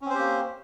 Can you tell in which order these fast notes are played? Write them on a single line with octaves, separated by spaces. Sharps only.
C#4 C4 C5 G4 A#3